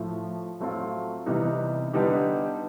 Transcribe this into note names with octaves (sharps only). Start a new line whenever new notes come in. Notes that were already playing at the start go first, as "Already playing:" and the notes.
Already playing: A2 F3 A3
F#3 A3 C4 F4
C3 E3 G3 B3 D#4
D3 G3 B3 D#4 G4